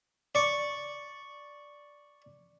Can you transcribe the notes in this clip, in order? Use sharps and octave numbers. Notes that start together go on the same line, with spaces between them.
D5 C#6